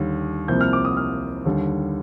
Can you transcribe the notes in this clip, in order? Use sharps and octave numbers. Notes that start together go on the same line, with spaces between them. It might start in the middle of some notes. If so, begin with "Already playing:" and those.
Already playing: D#2 D3 G3
C2 C3 F3 A#3 G6
F6
D6
D#6
F6
D#2 D3 G3